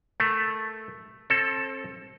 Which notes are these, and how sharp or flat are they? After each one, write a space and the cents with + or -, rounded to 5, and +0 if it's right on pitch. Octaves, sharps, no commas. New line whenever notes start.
A3 +0 A#4 +0
C4 +35 A4 +0